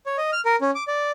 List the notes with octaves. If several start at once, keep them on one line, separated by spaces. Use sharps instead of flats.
C#5
D#5
F6
A#4
C#4
D6
D5